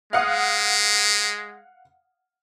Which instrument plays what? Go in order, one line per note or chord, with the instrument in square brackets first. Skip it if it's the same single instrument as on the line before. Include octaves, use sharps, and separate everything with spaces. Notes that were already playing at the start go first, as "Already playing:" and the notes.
[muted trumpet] G#3 [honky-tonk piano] F5 F#5 D#6